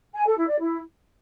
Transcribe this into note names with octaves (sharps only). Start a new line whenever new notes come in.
G#5
A4
E4
D5
E4